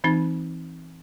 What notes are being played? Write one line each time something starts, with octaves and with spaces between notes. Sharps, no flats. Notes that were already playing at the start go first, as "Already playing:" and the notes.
E3 C4 D#4